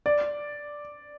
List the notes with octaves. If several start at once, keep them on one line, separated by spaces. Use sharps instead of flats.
D5